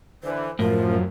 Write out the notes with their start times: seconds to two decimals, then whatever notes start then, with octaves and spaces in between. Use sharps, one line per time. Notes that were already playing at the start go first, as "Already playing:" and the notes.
0.24 D3 E3 C5
0.59 F#2 A2 F3 A#4